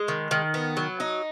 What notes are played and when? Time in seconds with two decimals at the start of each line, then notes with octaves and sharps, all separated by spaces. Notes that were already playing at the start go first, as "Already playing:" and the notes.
Already playing: G#3
0.08 D#3
0.31 D#3
0.54 B3
0.77 F#3
1.00 D#4